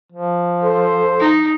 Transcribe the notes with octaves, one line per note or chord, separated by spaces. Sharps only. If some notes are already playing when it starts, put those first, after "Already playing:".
F3
A4 C5
D#4